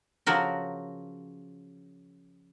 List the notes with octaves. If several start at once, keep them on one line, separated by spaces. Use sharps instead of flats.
C#3 F3 F#3 F#4 A#4